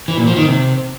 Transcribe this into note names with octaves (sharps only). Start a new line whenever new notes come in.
E3
A#2
F3
D#3
C3